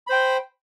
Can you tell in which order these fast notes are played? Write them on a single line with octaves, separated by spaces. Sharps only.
B5 C5 G5